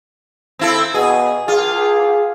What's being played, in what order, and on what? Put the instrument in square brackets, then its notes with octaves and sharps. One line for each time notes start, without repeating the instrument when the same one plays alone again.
[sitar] C4 E4 A4
[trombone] B2 [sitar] G#4
[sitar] F4 [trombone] G#4